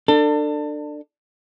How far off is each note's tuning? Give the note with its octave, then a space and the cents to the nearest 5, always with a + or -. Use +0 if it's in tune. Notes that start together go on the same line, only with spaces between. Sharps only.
D4 +20 A4 +30